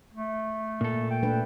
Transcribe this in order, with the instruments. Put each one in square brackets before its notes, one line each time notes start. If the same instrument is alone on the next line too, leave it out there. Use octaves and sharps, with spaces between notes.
[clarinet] A3
[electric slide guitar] A#2 A4
[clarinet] G5
[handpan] A3 D4 B4